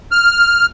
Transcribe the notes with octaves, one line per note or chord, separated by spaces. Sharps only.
F6